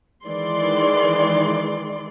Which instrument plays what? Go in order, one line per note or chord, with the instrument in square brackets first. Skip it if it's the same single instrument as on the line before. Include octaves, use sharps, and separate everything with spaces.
[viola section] D#3 E3 G#3 D5 C6